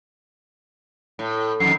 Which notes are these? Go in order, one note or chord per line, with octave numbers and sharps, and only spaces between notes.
A2
F2 D#3 C7